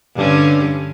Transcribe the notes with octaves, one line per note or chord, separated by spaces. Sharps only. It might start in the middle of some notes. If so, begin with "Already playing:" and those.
G2 D3 C#4